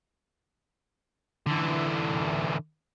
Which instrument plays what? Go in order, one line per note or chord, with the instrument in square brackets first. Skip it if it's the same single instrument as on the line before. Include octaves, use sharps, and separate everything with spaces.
[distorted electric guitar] D3 E3